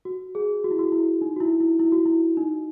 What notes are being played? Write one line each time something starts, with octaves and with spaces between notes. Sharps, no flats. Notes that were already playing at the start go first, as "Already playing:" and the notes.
F#4
G#4
F#4
E4
F#4
E4
D#4
F#4
E4
E4
E4
F#4
E4
D#4